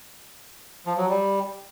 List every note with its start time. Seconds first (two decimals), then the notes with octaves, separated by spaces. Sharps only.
0.86 F3
0.98 F#3
1.09 G3